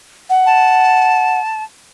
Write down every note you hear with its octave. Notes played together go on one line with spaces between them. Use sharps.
F#5
A5